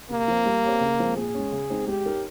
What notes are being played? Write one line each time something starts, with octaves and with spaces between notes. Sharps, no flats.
C3 A#3
F3 C4
G3
C4 G4 C#5
C#3
F3 G#3 C4
A#2 G#4
G#3 C#4
C#3
G#3 C4 D#4
G#3 G4
D#4 A#4 C#5